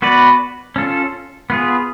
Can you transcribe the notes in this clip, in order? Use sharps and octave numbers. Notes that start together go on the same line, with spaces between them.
B3 F#4 B4 D5
C#4 F4 A4
B3 F4 G#4